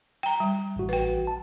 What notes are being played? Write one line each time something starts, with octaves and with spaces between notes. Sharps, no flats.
G5 A#5
G3
A1 F#4
B4 G5
A5